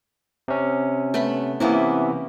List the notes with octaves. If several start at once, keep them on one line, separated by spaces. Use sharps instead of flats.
C3 C#4
A3 B3 B5
C3 E3 A#3 B3 C#4 E4